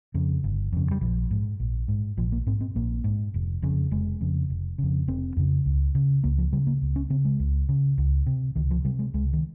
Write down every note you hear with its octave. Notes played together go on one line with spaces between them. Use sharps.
F2 C#3
G1
F2 C#3
G3
A#1 F3
G#2
A#1
G#2
A#1 F3
A#3
G#2 C4
C4
A#1 A#3
G#2
F1
F2 C#3
F1 G#3
F2 C#3
F1
F2 C#3
F1 C4
F2 C#3
C#2
C#3
C#2 A#3
F3
C#3 G3
A#3
C#2
C#4
C#3 C4
G#3
C#2
C#3
C#2
C3
C#2 D#3
F3
C3 G3
G#3
C#2 G#3
D#3